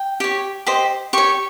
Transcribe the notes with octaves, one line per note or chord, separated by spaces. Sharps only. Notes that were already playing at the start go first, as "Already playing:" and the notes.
Already playing: G5
G4 C#5
G4 C5 D#5
G4 C#5 C#6